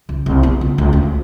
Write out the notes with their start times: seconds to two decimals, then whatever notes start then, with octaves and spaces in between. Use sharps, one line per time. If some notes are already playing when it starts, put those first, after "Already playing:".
0.09 C#2
0.26 C2
0.43 B3
0.61 C#2
0.78 C#2
0.93 D2